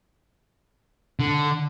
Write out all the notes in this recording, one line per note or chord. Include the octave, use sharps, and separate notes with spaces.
D3